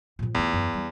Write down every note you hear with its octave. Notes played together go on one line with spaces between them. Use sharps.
A#2 F3
E2 A3 F4
F#2
G3